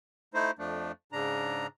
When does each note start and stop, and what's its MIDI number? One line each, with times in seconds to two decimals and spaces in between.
0.34 0.51 57
0.34 0.51 63
0.34 0.51 64
0.34 0.51 72
0.59 0.92 41
0.59 0.92 53
0.59 0.92 57
0.59 0.92 62
1.12 1.67 44
1.12 1.67 49
1.12 1.67 62
1.12 1.67 82